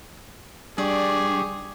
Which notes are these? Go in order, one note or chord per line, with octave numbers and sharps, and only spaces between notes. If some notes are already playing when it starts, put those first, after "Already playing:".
G3 D4 G4 G#4 D5 C#6